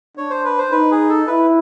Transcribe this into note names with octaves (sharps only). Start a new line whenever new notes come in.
D4 C#5
C5
B4
C5
D#4 B4
G#4
A4
E4 B4